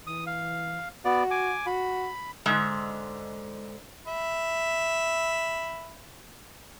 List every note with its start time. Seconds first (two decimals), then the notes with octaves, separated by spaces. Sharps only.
0.07 E3 D#6
0.26 F5
1.05 B3 F#4 D5
1.31 G#5 D6
1.66 F#4 B5
2.46 G#2 D3 G#3 E5
4.07 E5 B5